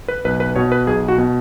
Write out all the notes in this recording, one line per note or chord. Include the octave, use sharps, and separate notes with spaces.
B4
B1 B4
B4
B2 C#5
B4
B1 G#4
F#4
B2